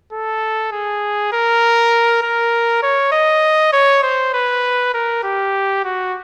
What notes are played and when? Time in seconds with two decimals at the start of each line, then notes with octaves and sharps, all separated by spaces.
0.13 A4
0.72 G#4
1.32 A#4
2.22 A#4
2.83 C#5
3.12 D#5
3.73 C#5
4.03 C5
4.34 B4
4.94 A#4
5.24 G4
5.84 F#4